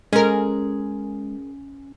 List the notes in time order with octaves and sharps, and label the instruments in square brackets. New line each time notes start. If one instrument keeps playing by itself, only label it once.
[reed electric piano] G#3 [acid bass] C#4 [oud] G#4 A#4